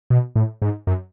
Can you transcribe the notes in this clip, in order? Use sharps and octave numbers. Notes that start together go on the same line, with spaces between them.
B2
A2
G#2
F#2